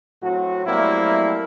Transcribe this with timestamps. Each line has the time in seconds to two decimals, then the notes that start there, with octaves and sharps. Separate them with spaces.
0.23 A2 F#3 C4 F#4
0.66 F#3 G3 A3 A#3 C4 E4